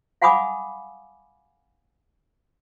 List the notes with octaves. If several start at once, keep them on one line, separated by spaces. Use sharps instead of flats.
F5 F#5 G#5 B5 D6 D#6